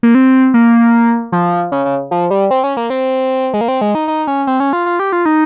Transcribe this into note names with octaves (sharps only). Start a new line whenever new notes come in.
A#3
C4
A#3
F3
C#3
C#3
F3
G3
C4
C#4
A#3
C4
G#3
A#3
C4
G#3
D#4
D#4
C#4
C4
C#4
F4
F4
G4
F4
D#4